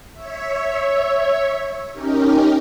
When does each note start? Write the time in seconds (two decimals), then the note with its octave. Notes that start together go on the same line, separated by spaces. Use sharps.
0.13 C#5 E5
1.93 C#4 D#4 G4 A#4